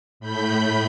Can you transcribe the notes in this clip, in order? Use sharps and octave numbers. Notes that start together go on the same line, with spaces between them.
A2 B5 G6